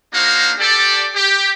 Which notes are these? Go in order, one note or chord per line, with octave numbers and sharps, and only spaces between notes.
A#3 D4 D#4 F#4 C5 F5
G4 A4 D5
G4